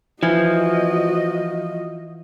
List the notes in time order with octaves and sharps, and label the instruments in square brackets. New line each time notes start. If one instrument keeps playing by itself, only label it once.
[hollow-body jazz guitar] E3 [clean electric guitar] F3 [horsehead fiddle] F#4 D#5